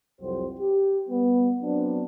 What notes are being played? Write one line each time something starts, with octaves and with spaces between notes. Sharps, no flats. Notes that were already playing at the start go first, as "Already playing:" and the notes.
C2 F2 F#3 G4 C5
G4
G3 B3
F#3 B3 C4 D4